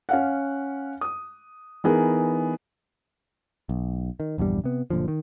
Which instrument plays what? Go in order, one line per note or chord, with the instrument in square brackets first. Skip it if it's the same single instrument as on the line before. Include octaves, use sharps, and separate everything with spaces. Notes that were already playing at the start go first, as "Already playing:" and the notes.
[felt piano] C#4 F5 F#5
D#6
E3 B3 D#4 G#4 A#4
[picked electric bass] B1
D#3
A#1 E2 G2 G3
C3 B3
F#1 A#2 D3 F3
D#3